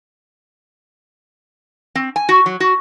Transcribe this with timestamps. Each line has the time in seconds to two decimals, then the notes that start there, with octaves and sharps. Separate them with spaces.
1.95 C4
2.16 G#5
2.29 F#4
2.46 F#3
2.60 F#4